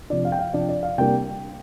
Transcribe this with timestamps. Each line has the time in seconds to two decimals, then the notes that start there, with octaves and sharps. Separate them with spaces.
0.10 C3 F3 D4 D5
0.25 F5
0.32 G5
0.39 F5
0.54 C3 F3 D4 D5
0.69 D5
0.83 F5
0.98 C3 G3 A#3 D4 G5